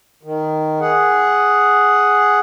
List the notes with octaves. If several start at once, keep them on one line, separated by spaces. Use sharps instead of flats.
D#3
G#4 F#5